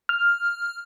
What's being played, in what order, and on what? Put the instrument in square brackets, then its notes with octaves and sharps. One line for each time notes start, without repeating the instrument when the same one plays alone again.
[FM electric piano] F6